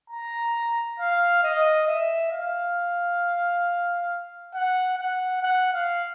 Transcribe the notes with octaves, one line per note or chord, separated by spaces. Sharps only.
A#5
F5
D#5
E5
F5
F#5
F#5
F#5
F5